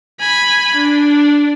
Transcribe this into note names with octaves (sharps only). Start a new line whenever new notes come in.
G#5 B5
D4